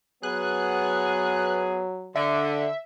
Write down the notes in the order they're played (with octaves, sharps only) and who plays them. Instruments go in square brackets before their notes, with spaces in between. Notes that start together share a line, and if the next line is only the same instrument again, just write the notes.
[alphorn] F#3 [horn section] B3 G#4 [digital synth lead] F#6
[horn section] D3 [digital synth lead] E5